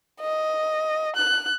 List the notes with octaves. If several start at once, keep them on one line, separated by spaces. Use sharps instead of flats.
D#5
F#6